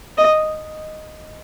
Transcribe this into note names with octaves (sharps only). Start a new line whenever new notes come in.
D#5